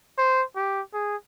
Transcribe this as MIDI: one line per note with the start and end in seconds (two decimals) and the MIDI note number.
0.18 0.43 72
0.56 0.81 67
0.94 1.16 68